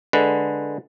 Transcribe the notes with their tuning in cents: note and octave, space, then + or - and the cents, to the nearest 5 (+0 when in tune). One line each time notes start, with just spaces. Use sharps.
D3 +0 G#3 +5 B4 -10